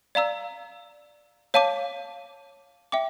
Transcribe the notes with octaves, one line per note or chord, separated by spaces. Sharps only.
D5 F5 A#5 E6
C#5 F5 A5 D6
E5 G5 D6